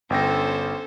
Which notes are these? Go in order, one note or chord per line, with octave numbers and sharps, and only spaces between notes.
G1 C#4 A4 C5 G5 A#6